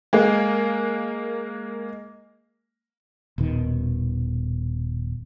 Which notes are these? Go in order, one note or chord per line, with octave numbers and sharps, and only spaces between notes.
G#3 A#3
D#1 D#2 B2 D#3